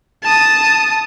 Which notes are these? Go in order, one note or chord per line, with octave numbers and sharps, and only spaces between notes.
A5 D#6